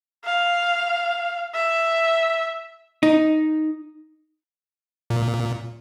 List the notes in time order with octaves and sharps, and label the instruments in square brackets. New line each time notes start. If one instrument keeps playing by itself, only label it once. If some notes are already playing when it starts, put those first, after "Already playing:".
[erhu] F5
E5
[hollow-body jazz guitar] D#4
[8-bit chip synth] A#2